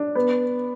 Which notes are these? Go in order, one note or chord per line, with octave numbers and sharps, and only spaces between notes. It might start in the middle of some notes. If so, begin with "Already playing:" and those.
Already playing: D4
B3